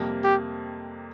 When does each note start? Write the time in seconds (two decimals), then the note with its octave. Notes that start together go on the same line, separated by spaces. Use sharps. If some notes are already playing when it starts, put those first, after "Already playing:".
Already playing: F2 C3 G3 A#3
0.24 G4